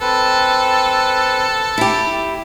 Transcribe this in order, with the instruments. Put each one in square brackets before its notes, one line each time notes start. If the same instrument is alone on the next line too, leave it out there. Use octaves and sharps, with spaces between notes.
[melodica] C4 B4 [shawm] A4
[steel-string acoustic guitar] E4 G4